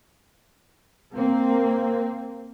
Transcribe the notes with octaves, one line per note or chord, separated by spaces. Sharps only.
A#3 C4